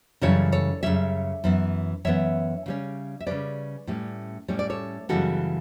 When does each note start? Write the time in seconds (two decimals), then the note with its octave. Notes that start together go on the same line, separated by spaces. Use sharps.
0.21 F#2 C#3 E3 G3 A4 C#5
0.52 A4 C#5
0.83 F#2 C#3 E3 G3 C#5 E5
1.44 F#2 E3 B3
2.05 F#2 E3 B3 C#5 E5
2.66 C#3 G3 C#4
3.20 E5
3.27 C#3 G3 C#4 B4 D5
3.87 A2 G3 C#4
4.48 A2 G3 C#4 C#5
4.59 D5
4.70 A4 C#5
5.09 F#2 C#3 E3 G3 B3 F#4 A4